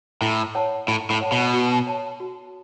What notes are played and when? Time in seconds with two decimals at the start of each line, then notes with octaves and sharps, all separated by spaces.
0.22 A2 E4
0.55 C#5 F#5 A5
0.88 A2 E4
1.10 A2
1.21 C#5 F#5 A5
1.32 B2
1.54 F#4
1.87 C#5 A5
2.20 F#4